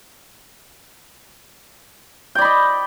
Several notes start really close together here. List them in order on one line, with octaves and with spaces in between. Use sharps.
G5 D5 B5 D#5